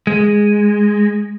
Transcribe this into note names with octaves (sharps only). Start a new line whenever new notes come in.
G#3